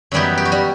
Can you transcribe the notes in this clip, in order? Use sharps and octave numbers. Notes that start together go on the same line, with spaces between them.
F#2 E3 G3 B3 D#4 G4
G4
F#4
G3 G4